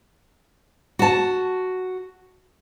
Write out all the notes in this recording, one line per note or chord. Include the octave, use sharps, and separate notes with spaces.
F#4 A5